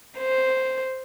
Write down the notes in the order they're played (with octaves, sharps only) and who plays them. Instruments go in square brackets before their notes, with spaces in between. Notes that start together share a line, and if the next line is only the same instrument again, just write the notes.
[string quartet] C5